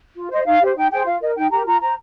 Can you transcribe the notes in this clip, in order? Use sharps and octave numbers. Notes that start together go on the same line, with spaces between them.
F4
C5 D#5
D#4 F5
G4 C5
D#4 G5
G#4 C5 G5
F4 F5
A#4 D#5
D#4 G5
G4 A#4 A#5
F4 A#5
C5 A#5